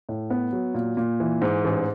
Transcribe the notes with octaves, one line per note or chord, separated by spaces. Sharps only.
A2
B3
F#3
A#2
A#2
E3
G#2
A1